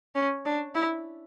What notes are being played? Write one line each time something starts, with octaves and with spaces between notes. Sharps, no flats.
C#4
D4
E4